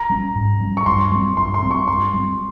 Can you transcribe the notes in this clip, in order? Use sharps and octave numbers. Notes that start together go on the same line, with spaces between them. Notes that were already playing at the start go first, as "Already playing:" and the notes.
Already playing: A#5
G3 C#4
G#2
G3 C#4
C#6
G2 C6
G3 C4 C#6
G2 C6
C6
G3 C4
C#6
G2 C6
G3 C4